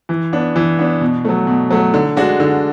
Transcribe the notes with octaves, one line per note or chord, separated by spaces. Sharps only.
E3
B3 D4
E3
B3 D4
B2
F#3 A3
B2
F#3 A3
D3
G#3 D4 F#4
D3